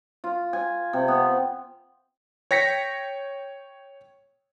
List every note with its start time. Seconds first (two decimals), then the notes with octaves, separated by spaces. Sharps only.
0.24 F4
0.53 G#5
0.93 C3
1.08 B3
2.51 C#5 G5 A#6 B6 C#7